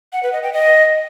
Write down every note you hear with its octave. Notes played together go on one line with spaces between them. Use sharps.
F#5
B4
D#5
G5
D#5